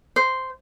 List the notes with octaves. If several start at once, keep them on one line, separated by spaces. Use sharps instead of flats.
C5